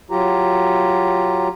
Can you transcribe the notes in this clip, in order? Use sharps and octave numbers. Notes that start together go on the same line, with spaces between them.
F#3 F4 G4 A#5